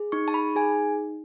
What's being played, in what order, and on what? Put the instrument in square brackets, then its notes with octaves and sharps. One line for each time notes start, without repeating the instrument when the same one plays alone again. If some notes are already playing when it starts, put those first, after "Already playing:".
Already playing: [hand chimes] G#4
D#4 C#6
A5
B5
G#4 G#5